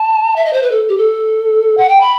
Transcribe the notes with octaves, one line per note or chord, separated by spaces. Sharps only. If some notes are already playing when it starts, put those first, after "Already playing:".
Already playing: A5
E5
D#5
C5
B4
A4
G4
A4
F#5
G5
B5